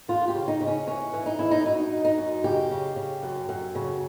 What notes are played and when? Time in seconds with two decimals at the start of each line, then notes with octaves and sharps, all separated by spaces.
0.08 E2 F4
0.28 G4
0.35 C#3
0.48 D#4
0.61 C#3
0.67 C#4
0.87 E3 C#4
1.13 E3
1.26 D#4
1.39 E2 E4
1.51 D#4
1.66 F#2 D#4
1.92 F#2
2.05 D#4
2.18 F#2
2.44 C#3 G4
2.71 C#3
2.96 C#3
3.23 F#2
3.49 F#2
3.75 C#3